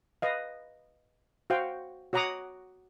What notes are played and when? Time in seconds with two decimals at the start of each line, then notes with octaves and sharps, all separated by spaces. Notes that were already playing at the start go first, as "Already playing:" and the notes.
0.22 B4 D#5 F5
1.50 F#4 C5 F5 G5
2.13 F#4 C#5 F#5 A#5 D6 D#6